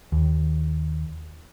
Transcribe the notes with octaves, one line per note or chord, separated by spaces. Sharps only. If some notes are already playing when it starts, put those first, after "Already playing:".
D#2